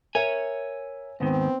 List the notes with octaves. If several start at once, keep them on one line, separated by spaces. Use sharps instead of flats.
A#4 C#5 E5 G#5
D#2 G#2 D#3 B3 C4